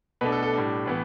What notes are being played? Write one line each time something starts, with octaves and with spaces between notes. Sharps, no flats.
B2 A3 D4 B4
A4
A4
A2 G3 D4
A2 E3 B3